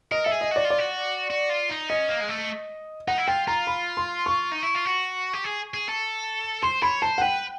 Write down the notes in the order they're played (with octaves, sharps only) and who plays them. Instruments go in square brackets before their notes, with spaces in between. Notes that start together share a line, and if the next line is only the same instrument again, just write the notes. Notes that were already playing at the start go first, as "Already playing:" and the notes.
[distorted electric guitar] A#4 [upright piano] D#5
[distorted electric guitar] A4 [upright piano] E5
[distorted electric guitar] G#4
[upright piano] D#5
[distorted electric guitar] F#4 [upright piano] D5
[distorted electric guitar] F4
[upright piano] D5
[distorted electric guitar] F#4
F#4
F4
D#4
[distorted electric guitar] C#4 [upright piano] D#5
[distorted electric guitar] A#3
G#3
A3
[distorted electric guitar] D#4 [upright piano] F#5
[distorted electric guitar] E4
[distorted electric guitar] F4 [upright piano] G5
[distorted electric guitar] F4 [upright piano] A#5
[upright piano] B5
C6
C#6
[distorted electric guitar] D#4
E4
F4
F#4
G4
G#4
G#4
A4
[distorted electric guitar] C5 [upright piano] C6
[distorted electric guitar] C#5 [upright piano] B5
[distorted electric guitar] C5 [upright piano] A5
[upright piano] F#5
[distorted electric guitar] B4 [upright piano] G5